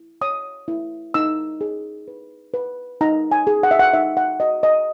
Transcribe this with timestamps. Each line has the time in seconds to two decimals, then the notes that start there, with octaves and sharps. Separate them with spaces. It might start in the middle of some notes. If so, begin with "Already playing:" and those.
Already playing: E4
0.21 C#5 D#6
0.68 E4
1.14 D#4 E6
1.61 G#4
2.08 B4
2.54 B4
3.01 D#4 A#5
3.32 G#5
3.47 G#4
3.63 F#5
3.71 E5
3.79 F#5
3.93 D#4 E5
4.17 F#5
4.40 F#4 D#5
4.63 D#5